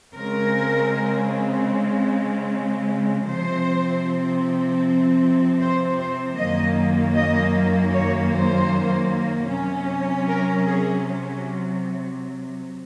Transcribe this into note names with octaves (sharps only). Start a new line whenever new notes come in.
C#3 G#3 C4 A#4
C3 F3 C4 C5
C5
C5
F#2 D#3 F#3 A#3 D#5
D#5
C#5
C5
C3 F#3 C#4
A#4
G#4